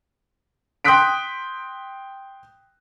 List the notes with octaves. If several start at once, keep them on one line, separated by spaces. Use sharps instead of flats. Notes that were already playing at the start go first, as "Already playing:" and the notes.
G5 C6 D#6 F#6 B6 D7